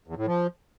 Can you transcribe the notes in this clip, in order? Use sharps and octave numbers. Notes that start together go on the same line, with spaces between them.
E2
A2
F3